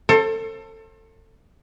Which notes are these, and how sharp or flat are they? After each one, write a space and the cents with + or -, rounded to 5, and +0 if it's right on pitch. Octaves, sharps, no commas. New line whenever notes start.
A4 +25 C5 +40